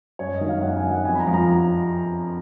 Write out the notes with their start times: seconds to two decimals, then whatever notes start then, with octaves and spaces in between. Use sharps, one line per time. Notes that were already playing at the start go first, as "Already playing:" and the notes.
0.19 F#2 C#5
0.34 D#5
0.41 D#3 F#3
0.49 F5
0.62 F#2 F#5
0.77 G#5
0.84 D#3 F#3
0.92 F#5
1.05 F2 G#5
1.15 B5
1.20 A#5
1.27 F3
1.34 A#5